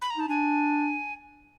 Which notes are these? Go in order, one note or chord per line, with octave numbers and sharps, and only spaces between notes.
B5
A#5
D#4 A5
D4 G#5